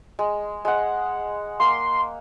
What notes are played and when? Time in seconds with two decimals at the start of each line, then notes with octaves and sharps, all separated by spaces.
0.19 G#3
0.65 G#3 F#5
1.60 A#3 C6